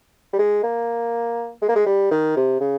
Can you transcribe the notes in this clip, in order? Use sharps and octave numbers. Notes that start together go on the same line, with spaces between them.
G3
G#3
A#3
G#3
A#3
G#3
G3
D#3
C3
C#3